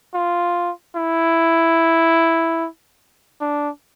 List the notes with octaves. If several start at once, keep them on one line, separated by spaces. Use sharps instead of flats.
F4
E4
D4